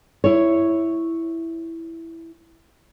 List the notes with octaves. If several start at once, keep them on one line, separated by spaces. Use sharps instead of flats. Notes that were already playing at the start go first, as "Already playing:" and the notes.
E4 C#5